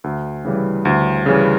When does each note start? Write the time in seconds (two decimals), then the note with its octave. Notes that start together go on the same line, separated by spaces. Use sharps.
0.04 D2
0.45 C#3 E3 G3
0.85 D2
1.26 C#3 E3 G3